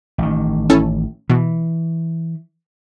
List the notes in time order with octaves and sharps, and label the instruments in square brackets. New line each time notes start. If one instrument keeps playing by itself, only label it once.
[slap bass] A1 D#3
[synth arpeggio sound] C#4 E4 A4
[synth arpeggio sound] B2 [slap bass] E3